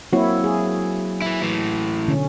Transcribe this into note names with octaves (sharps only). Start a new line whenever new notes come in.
F#3 A#3 C4 E4 F#4 C#5
G#4
E3 E4
A2 E3
B2 D3 C#4